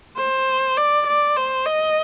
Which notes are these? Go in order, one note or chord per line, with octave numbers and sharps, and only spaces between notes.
C5
D5
D5
C5
D#5